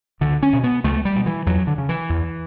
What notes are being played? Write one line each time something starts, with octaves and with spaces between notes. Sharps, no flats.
C#2 D3
C#4
B2
B3
C#2 A3
G3
B2
E3
E2 F#3
D3
C#3
E3
E2